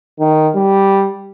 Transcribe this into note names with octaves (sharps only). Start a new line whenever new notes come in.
D#3
G3